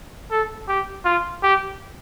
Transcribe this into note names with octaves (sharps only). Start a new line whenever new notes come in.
A4
G4
F4
G4